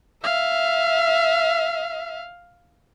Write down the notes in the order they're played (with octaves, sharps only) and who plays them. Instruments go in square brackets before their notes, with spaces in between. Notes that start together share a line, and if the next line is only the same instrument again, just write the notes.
[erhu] E5 [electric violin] F5